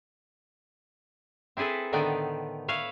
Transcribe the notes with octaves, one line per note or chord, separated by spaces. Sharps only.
C4 E4 G#4 A4 B4
A2 D3 D#3 B3 D5 G5
B4 C#5 E5 F5